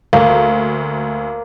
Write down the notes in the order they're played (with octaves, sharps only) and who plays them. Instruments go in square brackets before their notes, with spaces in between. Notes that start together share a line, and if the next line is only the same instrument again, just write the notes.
[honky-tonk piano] D2 [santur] A#3